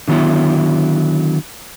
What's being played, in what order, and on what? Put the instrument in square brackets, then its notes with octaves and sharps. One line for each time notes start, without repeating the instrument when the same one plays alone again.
[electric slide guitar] D3 D#3 F#3 B3 E4